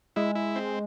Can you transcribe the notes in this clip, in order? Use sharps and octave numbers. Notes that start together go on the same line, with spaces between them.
G#3 E4
E4
C4